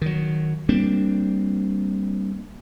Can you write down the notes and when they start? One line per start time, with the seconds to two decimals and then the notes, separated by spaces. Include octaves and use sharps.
0.02 D#3 F#3
0.69 G3 A#3 C4 D4